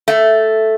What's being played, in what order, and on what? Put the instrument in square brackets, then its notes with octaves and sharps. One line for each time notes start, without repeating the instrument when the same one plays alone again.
[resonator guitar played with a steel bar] A3